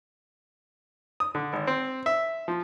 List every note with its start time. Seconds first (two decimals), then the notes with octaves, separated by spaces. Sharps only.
1.20 D#6
1.35 D3
1.53 G#1
1.67 C4
2.06 E5
2.48 F3